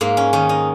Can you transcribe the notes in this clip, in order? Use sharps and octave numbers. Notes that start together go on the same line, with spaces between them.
G#2 A#3
C#4
D#3 C#4
D#4